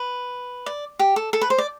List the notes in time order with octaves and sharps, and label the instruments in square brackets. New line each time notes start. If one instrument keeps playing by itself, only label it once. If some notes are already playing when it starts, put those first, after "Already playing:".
Already playing: [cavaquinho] B4
D5
G4
A4
A4
B4
C5
D5